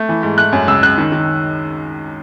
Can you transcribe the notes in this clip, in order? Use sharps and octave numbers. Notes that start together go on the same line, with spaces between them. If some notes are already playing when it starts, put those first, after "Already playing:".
Already playing: A3
E3
G#2
A3 F#6
F#2
C#2 E6
C#2 F#6
D#3
D#3